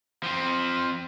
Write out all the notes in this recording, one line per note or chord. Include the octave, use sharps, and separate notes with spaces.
F3 C4